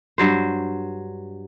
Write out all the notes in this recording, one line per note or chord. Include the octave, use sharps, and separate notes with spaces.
G2 F#3 C5